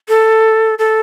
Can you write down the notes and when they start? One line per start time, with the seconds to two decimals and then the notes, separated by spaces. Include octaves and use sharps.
0.08 A4
0.79 A4